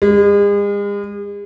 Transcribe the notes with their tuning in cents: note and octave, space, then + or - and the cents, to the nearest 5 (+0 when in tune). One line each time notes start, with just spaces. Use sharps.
G#3 -40